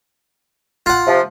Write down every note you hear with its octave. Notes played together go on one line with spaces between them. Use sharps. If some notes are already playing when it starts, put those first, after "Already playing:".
F4 F#5
C3 F3